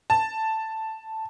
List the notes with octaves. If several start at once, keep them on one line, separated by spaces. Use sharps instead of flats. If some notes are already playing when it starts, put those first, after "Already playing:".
A5